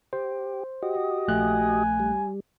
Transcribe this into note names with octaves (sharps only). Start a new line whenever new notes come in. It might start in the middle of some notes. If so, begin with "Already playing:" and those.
G4 C5
F#4 G4 D#5
A#1 A3 G#5 F#6
G3